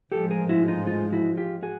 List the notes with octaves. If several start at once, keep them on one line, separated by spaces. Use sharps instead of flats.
A1 G#2 F3 G#3 G4 A4
G#4 A#4
E4 F#4
D#4 F4
D#4 F4
E4 F#4
F4 G4
F#4 G#4